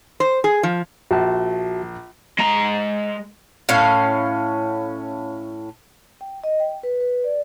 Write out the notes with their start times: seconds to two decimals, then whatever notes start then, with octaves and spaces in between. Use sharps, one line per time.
0.20 C5
0.44 G#4
0.63 F3
1.11 A#1 F#4 E5 A5
2.39 G#3 A#5
3.69 A2 C#4 F5
6.21 G5
6.44 D#5
6.60 G5
6.83 B4
7.00 B4
7.24 D5